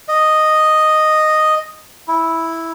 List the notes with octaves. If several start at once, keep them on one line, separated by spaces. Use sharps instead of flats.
D#5
E4